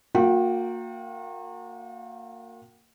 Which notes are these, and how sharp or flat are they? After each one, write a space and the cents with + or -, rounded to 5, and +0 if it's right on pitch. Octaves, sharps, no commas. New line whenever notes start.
A#3 -20 F#4 -45 G5 -20